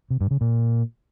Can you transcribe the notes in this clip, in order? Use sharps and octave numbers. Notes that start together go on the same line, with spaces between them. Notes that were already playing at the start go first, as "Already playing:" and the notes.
C3
G2
C#3
A#2